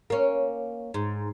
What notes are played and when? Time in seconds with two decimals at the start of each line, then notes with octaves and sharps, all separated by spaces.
0.10 A#3 C#4
0.94 G#2